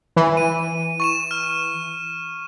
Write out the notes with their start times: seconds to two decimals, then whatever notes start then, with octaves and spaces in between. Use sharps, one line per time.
0.16 E3
0.37 D#7
1.00 C#6 D#7 E7
1.31 F6